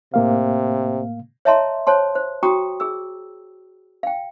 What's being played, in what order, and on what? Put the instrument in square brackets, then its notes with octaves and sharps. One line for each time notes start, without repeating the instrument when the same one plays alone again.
[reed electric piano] A2 A#3 F5 [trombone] C3
[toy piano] C#5 D#5 E5 A5 A#5 C6
C5 C#5 A5 C6
C5
F#4 G5 A#5 C#6 D#6
G#4 E6
F5 G5